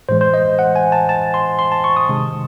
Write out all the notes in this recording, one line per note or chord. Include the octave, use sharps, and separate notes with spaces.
A2 E3 G#3 C5
C5
D#5
F#5
G#5
A5
A5
C6
C6
A5
C#6
D#6
C3 D#3 G#3